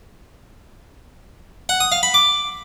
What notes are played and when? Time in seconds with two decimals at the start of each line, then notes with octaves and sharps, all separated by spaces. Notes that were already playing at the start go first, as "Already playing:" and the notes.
1.69 F#5
1.80 D#6
1.92 F5
2.03 B5
2.14 D6